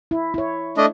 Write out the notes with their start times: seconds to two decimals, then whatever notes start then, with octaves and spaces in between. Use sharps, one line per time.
0.11 E4
0.34 E4 C#5
0.77 A3 D4 D#5